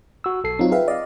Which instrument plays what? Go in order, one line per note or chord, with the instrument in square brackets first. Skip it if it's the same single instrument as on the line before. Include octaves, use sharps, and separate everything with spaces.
[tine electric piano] F#4 E6
B1 A4 C7
[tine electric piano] F#3 D#4 [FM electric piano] C4 F4
[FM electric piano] G#4 B4 E5 [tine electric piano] F5 G5
[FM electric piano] D5 [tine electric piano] D#5 F5